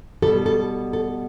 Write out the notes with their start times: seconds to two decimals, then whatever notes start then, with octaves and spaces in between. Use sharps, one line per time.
0.22 G3 A4
0.26 B2
0.46 A4
0.93 A4